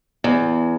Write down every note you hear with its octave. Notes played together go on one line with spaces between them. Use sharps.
E2